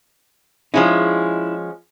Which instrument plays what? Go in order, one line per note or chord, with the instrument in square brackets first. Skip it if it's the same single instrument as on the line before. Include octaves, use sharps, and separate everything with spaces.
[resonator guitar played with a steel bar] F3 G#3 C#4 [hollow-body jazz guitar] D#4 E4